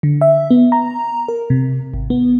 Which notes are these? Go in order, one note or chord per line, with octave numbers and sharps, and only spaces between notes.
D3
E5
B3
A#5
A#4
C3
G#1
B3